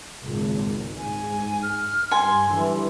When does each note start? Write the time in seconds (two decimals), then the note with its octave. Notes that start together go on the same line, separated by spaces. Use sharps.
0.22 G#1 C#2 A#2
0.98 G#2 G#5
1.63 F6
2.11 G2 G#5 C6
2.50 D3 E3 G3